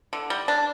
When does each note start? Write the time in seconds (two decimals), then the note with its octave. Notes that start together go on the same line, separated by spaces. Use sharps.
0.13 D3
0.30 G3
0.48 D4